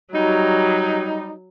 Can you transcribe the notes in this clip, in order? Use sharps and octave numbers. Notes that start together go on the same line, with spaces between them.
F#3 G3 D#4